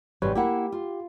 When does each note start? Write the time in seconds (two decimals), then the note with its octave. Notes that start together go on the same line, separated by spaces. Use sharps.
0.22 G#1 G#2 C3 G3 B4 C#5
0.35 A#3 E4 G4 F#5
0.72 F4